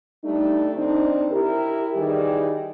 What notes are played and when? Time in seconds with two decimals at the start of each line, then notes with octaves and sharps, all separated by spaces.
0.24 G3 A3 D4 D#4
0.75 D3 C4 D4 D#4
1.32 E4 G4 A#4
1.96 D#3 E3 G3 G4 G#4 D5